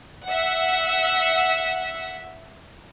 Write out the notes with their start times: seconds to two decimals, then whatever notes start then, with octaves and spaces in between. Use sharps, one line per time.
0.26 E5 F#5